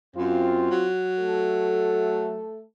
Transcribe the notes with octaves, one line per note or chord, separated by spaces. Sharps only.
F#2 C4 F4
F#3
A3 A4